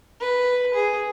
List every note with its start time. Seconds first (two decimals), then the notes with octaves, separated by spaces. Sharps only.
0.20 B4
0.74 G#4